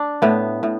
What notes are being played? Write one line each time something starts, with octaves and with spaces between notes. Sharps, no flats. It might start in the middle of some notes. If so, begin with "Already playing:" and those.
Already playing: D4
A2 B3
A2